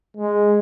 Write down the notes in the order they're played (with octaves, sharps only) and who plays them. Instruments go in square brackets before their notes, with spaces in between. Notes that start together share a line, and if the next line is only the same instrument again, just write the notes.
[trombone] G#3